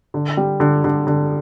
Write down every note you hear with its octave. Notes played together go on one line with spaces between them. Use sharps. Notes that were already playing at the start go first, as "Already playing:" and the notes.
D3
G3
D3
D3
D3